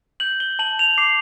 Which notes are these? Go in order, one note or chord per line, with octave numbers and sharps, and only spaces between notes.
G6 F#7
G7
A5 F#7
F7
D6 C7